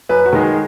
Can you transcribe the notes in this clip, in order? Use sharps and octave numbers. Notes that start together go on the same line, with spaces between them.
F#2 B4
F#4
D#3 G#3 D#4
G#4